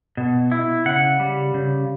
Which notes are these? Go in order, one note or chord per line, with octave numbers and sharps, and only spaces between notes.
B2
E4
C#3 F#5
G3
C#3